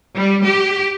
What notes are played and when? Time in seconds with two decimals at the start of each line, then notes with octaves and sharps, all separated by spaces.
0.14 G3
0.46 G4